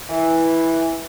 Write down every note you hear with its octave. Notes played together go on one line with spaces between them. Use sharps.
E3